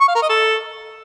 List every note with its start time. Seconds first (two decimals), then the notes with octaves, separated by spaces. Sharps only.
0.01 C#6
0.08 F5
0.15 A#4
0.22 D#5
0.29 A4